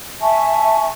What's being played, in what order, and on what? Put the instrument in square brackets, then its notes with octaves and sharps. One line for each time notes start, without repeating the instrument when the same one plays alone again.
[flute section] E5 G#5 A5 C#6